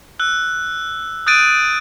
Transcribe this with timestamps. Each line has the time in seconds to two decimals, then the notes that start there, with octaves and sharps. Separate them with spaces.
0.20 E6 F#6
1.27 D#6 F#6 G6 A6 D7 D#7